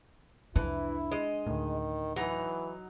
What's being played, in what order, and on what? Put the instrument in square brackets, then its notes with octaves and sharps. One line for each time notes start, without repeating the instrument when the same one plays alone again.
[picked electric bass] C2 F2 [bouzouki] E3 [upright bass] D4 [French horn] E4
[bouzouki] G#3 D#5
[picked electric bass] D2 A2 [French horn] D#3
[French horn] E3 [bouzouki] F#3 D#4 A#5